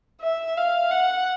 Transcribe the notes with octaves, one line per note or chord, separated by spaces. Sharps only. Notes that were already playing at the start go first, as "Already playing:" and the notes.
E5
F5
F#5